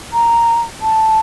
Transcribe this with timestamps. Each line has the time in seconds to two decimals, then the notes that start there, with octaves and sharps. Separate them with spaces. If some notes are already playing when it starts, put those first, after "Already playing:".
0.13 A#5
0.82 A5